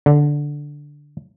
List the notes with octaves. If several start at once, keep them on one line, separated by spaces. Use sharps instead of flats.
D3